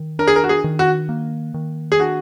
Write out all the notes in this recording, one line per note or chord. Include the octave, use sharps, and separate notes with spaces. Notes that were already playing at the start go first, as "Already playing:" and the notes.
Already playing: D#3
D4 A#4
G#4
A#4
F#4
G#4
D#3
F#4
A#3
D#3
G#4
D4 F#4